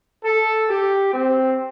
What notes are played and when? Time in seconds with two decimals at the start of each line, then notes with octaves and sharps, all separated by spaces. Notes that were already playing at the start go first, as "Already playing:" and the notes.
0.25 A4
0.68 G4
1.13 C4